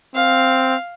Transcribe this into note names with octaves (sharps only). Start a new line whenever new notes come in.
C4 F5